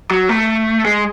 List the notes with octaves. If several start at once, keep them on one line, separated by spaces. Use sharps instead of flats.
F#3
A3
G#3